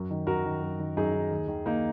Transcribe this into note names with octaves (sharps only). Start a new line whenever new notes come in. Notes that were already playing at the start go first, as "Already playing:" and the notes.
Already playing: F#2 F#4 A#4
D#3
F#2 F#4 A#4
D#3
F#2
D#3
F#2 D#4 G#4
D#3
D#2
D#3
D#2 A#3 D#4